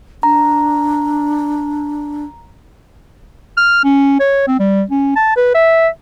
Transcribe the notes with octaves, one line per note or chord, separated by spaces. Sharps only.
D4 A#5
F6
C#4
C#5
C4
G3
C#4
A5
B4
E5